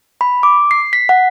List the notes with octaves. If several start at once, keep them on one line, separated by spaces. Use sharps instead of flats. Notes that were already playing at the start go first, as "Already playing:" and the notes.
B5
D6
C7
B6
F#5